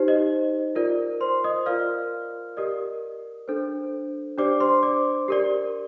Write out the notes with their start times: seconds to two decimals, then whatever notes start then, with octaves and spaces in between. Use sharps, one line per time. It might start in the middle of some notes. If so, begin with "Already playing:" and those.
Already playing: D#4 G4 C5
0.08 D#5
0.75 F4 A#4 D5
1.21 C5 C6
1.44 D#5 D#6
1.66 F4 A#4 D5 F5 F6
2.57 G4 A#4 D5 D#5 D#6
3.48 D4 A4 C5
4.38 D4 G4 C5 D5 D6
4.60 C5 C6
4.83 D5 D6
5.28 G4 A#4 D5